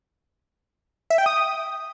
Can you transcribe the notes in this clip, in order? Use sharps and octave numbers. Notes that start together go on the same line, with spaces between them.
E5
G5
D#6